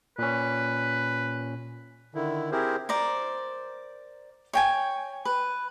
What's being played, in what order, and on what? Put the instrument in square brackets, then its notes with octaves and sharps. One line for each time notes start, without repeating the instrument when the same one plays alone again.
[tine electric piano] A#2 C#4 [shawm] B4
[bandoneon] D3 D#3 E4
C4 E4 G4 G#4 A#4 C5
[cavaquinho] A#4 C5 D5
C#5 G5 G#5
B4